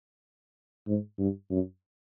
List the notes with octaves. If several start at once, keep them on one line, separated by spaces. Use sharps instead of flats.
G#2
G2
F#2